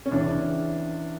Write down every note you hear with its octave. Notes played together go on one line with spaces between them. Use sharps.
C#4
C#2 C#3 E3 D4